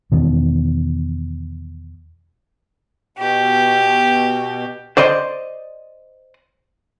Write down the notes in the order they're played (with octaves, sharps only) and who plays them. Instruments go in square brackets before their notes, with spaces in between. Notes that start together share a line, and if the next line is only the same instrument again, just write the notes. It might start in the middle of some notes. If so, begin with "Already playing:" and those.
[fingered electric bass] E2 B2 D#3
[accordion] B2 [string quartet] G4
[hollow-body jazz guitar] C5 D5 D#5 C6